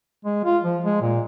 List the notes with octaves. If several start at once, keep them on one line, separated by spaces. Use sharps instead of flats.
G#3
F4
F3
G#3
A#2